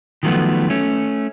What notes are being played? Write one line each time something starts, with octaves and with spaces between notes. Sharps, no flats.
D#3 F3 F#3 A3 B3
A3 C#4